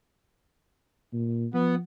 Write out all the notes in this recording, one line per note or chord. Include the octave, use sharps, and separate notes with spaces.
A#2
F3 B3